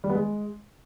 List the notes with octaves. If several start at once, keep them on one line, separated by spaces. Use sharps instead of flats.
G3
B3
G#3